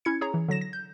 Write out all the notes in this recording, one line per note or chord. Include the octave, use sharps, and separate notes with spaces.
C#4 E4 G#6 C#7
G#4 C#5 A#5
E3
D3 F#3 A#6 E7
A#6
G6